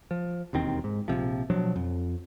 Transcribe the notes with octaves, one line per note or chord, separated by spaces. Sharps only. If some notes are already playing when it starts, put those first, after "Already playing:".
F3
E1 D#2 D#3 C4
G#2
A#1 D#2 C3 F3
B2 F3 F#3 D4
F2